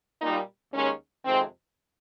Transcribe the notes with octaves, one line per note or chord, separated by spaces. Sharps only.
A#2 G3 D#4
D#2 D#3 G#3 C#4
F2 C3 D#3 G#3 C4